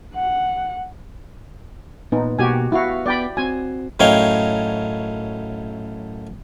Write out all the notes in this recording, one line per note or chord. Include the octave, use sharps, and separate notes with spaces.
F#5
A#2 B3 D#4
B2 A#3 F#4 G4 G#5
B3 E4 F#4 F5
B3 D5 G5 B5
C4 F#4 G#5
F#2 A2 D#4 C#5 F5 G5